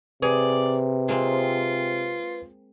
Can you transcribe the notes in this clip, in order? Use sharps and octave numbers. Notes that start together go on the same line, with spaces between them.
C3 G#4 B4 D5
G#3 A#3 C4 F4